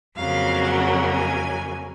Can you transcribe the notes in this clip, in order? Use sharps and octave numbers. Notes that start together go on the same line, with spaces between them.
F2 C#3 F#3 A#3 F5
F#5
G#5